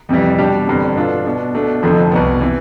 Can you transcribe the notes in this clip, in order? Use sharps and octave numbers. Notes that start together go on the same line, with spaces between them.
F2 C3 E3 G3
B2 G3 D4 G4
A1 G2 D3 G3 C4
B2 B3 D4 F4 A4
B2 B3 D4
B2 A3 D4
F1 F2 D3 F3 A3
C2 B2 B3
C3 E3